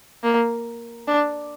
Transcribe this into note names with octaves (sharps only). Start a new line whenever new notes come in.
A#3
D4